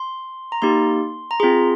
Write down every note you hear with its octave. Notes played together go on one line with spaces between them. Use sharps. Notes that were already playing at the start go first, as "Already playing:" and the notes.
Already playing: C6
A#5
A#3 D#4 G4 C6
A#5
C4 F4 G#4 C6